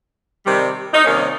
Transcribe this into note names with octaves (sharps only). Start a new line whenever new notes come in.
C3 D#3 G3
D#4
C3 D#3 G3 A#3 C#4